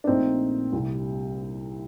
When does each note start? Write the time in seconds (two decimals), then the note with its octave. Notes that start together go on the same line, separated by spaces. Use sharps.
0.04 D4
0.07 A#1 A#2 A3 C4 D#4
0.73 C2 C3 G3